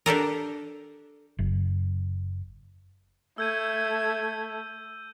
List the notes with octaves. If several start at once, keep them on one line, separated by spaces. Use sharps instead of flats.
D4 G4 A4 A#4
F#1
A3 E6 G6 G#6 D#7